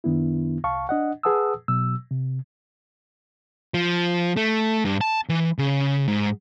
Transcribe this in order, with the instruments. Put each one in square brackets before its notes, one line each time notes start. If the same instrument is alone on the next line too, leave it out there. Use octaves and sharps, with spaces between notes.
[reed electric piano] F#2 D#3 B3 D4 E4
C2 F5 A5 C#6
D4 D#5 F#5
G#4 B4 F#5 A5 D#6 E6
B2 F#3 E6
C3
[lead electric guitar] F3
A3
G2
A5
E3
C#3
G#2